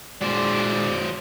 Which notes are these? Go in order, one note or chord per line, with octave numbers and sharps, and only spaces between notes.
A#2 F#3 G#3 C5 D5